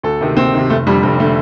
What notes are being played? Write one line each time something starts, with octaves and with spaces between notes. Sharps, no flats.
D2 A4
C3 D#3
D2 C4
C3 D#3
F1 A3
F2 D3 G3
F1 G3
D3 A3